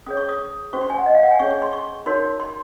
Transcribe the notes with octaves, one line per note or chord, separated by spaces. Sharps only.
C#4 G#4 C#5 D#6
C#6
D#6
C#4 F#4 C5 C#6
C6
G#5
F#5
D#5
F5
F#5
G#5
C#4 G#4 C#5 C#6
C#6
C6
C#6
D#4 F#4 A#4 C#5 C6
C6